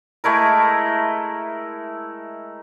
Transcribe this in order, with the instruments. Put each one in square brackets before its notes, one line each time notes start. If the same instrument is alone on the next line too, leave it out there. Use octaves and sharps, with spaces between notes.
[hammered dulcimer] G#3 A3 E4 A#4